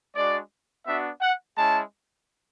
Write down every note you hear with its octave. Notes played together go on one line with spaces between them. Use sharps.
G#3 D4 F#4 D5
B3 D4 F#4 E5
F#5
G#3 C#4 E4 A5